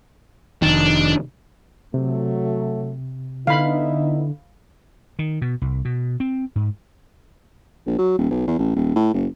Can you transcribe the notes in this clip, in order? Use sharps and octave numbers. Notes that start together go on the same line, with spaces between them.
F1 D#3 D4
C3 F#3 A3
D3 B3 D#4 E4 F5 B5
D#3
B2
C2
B2
C4
G#2
A#1
F#3
D#1
B1
E2
A1
D#1
A2
F#1